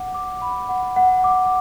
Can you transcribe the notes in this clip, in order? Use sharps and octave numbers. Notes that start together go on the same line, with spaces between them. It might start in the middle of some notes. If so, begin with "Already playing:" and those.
Already playing: F#5 D6
D6
B5
F#5
F#5
D6